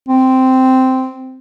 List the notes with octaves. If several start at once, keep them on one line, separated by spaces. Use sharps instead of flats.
C4